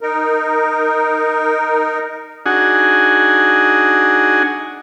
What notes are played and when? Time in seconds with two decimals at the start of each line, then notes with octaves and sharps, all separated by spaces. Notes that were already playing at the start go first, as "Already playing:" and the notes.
0.01 D#4 A#4
2.46 D4 D#4 F#4 G#4 F#5 G#5